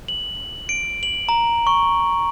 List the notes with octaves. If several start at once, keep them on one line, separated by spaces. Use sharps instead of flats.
F#7
D7
F#7
A#5
C#6